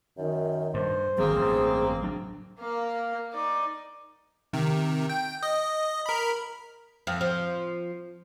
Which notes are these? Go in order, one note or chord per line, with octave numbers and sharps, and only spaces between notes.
F#2 D#3
G2 C5
G1 D#3 F#3 A#3 C4 G#4
A1 G2
F#3 D4
A#3 F5
D#4 D5
C3 D#3
G5
D#5
A#4 B5
F2
F3